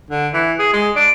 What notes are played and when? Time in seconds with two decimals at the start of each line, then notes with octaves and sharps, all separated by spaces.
0.11 D3
0.33 E3
0.59 G#4
0.73 G#3
0.96 D4